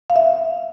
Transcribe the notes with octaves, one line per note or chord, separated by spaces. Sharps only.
F5
E5